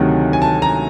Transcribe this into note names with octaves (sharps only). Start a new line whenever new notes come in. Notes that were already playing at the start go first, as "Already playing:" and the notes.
Already playing: D2 C3 D#3 F#3
G#5
A5
A#5